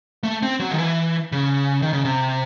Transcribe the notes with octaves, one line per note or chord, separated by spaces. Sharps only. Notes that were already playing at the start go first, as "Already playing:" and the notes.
A3
C4
F#3
D#3
E3
C#3
D#3
C#3
C3